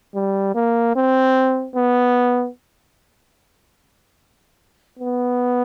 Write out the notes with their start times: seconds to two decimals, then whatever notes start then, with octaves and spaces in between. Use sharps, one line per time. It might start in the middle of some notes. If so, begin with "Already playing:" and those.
0.15 G3
0.55 A#3
0.96 C4
1.76 B3
4.99 B3